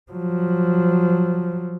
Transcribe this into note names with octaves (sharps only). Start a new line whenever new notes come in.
F3 F#3